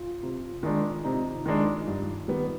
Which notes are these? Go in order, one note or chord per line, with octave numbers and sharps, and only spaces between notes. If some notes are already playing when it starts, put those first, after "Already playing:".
Already playing: F4
C3
D#3 G#3 D4
C3 D#4
D#3 G#3 D4
G2
D#3 G3 B3